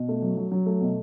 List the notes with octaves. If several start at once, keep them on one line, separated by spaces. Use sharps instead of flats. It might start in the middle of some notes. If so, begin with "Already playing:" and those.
Already playing: B2
A3
F#3
F#3
F#3
A3
B2